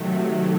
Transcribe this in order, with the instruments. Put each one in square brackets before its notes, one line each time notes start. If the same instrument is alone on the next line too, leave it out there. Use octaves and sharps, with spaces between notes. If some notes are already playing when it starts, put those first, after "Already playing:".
Already playing: [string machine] C3 D#3 F#3 A3